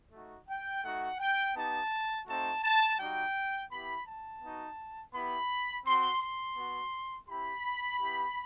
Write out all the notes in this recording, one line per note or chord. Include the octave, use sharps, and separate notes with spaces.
A3 D#4 F#4
G5
A3 D#4 F#4 F#5
G5
B3 D#4 G4 A5
A3 C4 D#4 F#4 A5
A5
G3 D#4 F#4 G5
B3 E4 G4 B5
A5
B3 D#4 F#4
B3 E4 G4 B5
C4 F#4 C6
C6
B3 F#4
C4 E4 G4 B5
B3 E4 G4